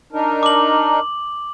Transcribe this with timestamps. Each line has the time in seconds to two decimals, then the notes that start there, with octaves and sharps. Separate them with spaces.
0.13 D4 D#4 A#4
0.43 D6 F#7